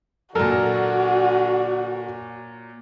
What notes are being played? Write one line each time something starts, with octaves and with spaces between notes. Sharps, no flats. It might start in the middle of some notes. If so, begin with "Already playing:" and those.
A#2 D3 F#3 F#4 A4 A#4